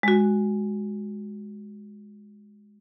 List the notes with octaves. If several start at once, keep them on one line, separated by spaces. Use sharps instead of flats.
G#3 F#4